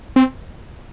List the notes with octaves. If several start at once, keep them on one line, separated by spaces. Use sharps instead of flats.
C4